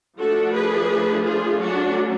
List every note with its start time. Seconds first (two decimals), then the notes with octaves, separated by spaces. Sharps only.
0.17 F3 A3 D4 F#4 A4
0.53 G#4 B4
1.24 F4 G#4
1.59 F#3 A3 C#4 D4 F#4